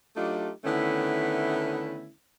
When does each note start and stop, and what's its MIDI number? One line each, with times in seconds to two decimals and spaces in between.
0.16 0.50 54
0.16 0.50 57
0.16 0.50 62
0.16 0.50 63
0.16 0.50 65
0.16 0.50 67
0.64 2.10 50
0.64 2.10 51
0.64 2.10 57
0.64 2.10 59
0.64 2.10 61
0.64 2.10 64